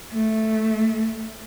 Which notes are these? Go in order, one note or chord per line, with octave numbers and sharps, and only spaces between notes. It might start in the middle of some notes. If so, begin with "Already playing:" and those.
A3